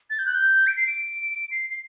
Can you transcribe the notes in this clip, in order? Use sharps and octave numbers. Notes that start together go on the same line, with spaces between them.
A6
G6
F#6
G6
D7
C7
D7
C7
C7